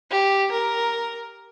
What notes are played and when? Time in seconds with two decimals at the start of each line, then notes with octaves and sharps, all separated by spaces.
0.10 G4
0.51 A#4